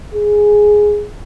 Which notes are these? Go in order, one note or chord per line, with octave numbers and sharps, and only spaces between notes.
G#4